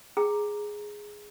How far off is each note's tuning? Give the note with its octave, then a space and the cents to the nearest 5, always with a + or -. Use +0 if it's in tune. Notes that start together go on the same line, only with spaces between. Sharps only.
G#4 +0 G5 +0 A#5 +0